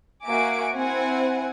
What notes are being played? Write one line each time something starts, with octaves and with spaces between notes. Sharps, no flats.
A#3 F#4 E5 G#5 D6 D7
C4 E4 F#5 G#5